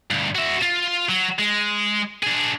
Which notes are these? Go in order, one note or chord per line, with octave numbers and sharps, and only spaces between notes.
D2 G2
F#4 E5
F4
F#3
G#3
D4 G#4